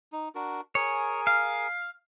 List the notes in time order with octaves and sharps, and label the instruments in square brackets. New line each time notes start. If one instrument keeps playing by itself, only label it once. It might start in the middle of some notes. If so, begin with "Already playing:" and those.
[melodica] D#4
D4 F#4 A#4
[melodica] G#4 A#4 G#5 [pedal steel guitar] C#5
[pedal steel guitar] F5